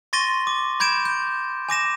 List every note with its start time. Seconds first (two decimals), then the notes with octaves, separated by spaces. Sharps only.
0.13 C6 C#6 A6 A#6 D#7 G7
0.47 D6
0.80 B5 G6 G#6 D7 E7
1.05 G6
1.69 G#5 D6 A#6 E7